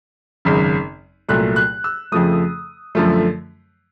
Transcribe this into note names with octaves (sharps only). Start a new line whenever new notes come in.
G#1 F#2 C#3
C2 A#2 F#3 A3 F#6
F#6
E6
F2 C#3 F3 A3 D#6
F#2 D3 F3 A3